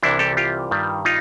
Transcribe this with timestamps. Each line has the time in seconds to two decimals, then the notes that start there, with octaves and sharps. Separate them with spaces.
0.03 C2 C3 E3 G3 D4 E4
0.19 G4 A4
0.37 F4 G4
0.71 G2 D#3 G3
1.05 D#4 F4